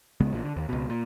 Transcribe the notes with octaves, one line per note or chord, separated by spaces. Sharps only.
C#2 C#3 G#3 B3
A1 A#2
D3
D#2
C#2 B2
A#2